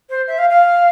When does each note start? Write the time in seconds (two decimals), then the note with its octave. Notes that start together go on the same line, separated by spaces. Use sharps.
0.09 C5
0.27 E5
0.38 F5
0.50 F5